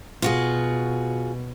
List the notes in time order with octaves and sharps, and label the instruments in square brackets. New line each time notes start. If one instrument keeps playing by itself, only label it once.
[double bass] B2 [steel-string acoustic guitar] F4 F#4 G#4